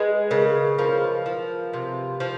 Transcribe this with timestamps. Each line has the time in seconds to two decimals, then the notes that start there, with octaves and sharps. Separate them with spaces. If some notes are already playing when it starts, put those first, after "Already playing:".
Already playing: G#3 B4
0.31 C#3 A#4
0.78 F3 A#4
1.26 F3
1.73 C3
2.20 F3